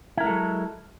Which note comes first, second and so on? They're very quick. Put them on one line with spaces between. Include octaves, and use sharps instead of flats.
E4 A#4 G#3 A4 F#3